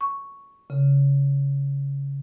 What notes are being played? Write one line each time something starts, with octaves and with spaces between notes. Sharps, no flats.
C#6
C#3